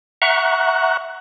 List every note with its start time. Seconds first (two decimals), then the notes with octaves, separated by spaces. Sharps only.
0.22 E5 F#5 A#5 C#6 F#6